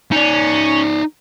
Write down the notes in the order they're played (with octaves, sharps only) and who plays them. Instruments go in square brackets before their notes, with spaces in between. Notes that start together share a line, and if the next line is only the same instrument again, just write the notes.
[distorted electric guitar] C#4 [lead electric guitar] D#4 D5